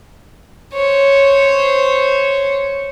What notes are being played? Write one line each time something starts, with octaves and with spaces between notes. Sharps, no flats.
C5 C#5